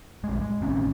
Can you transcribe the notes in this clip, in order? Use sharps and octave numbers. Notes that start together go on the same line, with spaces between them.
A#1 G#3
G#3
A1 D#3 C4 C#4